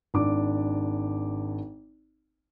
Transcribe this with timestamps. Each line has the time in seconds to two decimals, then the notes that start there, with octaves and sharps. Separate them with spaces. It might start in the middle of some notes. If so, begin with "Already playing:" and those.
0.14 G#1 D4 D6